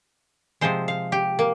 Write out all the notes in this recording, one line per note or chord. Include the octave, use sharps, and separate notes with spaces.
C3 F3 G#3 C5
F5
G4
A#3